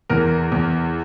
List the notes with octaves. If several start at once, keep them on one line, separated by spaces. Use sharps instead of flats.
E2 A#4
E2